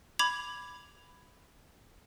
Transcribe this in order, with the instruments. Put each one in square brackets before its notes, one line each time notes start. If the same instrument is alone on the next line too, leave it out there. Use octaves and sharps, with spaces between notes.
[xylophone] B5 D6 G#6 F7